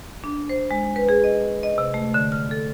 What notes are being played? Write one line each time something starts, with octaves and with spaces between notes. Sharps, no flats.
D4
C5
G#3
B4
G#4
D#5
D#5
C3
A3
D3
F6
A4